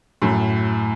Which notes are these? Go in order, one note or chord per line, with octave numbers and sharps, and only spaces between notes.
F#2 A2